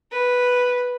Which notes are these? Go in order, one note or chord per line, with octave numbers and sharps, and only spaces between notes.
B4